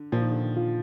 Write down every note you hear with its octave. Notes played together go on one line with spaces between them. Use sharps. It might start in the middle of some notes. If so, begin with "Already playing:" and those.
Already playing: D3
A#2 F3
D#3
D3
D#3
F4